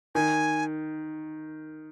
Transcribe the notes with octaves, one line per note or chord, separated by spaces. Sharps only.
D#3 G#5